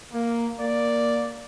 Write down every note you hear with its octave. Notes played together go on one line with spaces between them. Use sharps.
A#3
A#3 D5